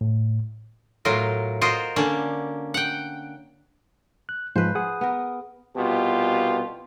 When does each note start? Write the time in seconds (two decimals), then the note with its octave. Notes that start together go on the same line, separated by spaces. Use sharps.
0.01 A2
1.05 A2 F#3 F4 A#4
1.61 F4 F#4 A#4 C5 D#5
1.96 D3 A#3 C#4 D4
2.74 F#5 G5
4.29 F#6
4.56 G#2 F3 G#3 B4 C5
4.75 G#4 F#5 D#6
5.01 B3 A#4
5.77 C2 B2 F4 G4